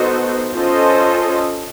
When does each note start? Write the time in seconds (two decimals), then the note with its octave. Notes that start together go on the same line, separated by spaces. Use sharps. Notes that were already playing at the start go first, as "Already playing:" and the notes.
Already playing: B3 D#4 F#4 A4 C5
0.53 C#4 F4 A4 C5 D#5